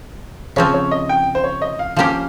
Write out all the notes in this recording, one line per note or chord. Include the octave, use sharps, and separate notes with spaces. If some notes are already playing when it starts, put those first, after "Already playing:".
C#3 F3 C4 C#5
C#5
D#5
G5
C5
C#5
D#5
F5
F3 A#3 C#4 G4 F5